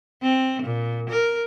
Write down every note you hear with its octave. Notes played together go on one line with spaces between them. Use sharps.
C4
A#2
A#4